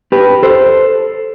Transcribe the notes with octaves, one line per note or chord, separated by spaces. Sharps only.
G4 B4
A4 C5